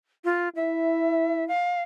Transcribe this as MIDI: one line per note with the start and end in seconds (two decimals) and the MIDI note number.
0.25 0.49 65
0.56 1.50 64
0.56 1.47 76
1.48 1.82 77